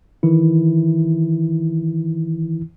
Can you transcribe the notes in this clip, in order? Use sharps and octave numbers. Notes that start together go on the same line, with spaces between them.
D#3 E3 E4